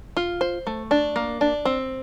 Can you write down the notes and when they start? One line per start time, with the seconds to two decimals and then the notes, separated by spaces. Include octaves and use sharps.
0.17 F4
0.41 C5
0.67 A3
0.91 D4
1.16 A#3
1.41 D4
1.65 C4